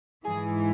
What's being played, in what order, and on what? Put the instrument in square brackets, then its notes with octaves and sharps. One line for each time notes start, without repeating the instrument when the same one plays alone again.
[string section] G#2 E3 G#4